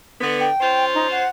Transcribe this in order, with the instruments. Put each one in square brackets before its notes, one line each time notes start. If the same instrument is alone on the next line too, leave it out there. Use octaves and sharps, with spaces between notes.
[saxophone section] D3 B3
[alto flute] G5
[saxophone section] C#4 F4 C5
[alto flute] D#4
F#5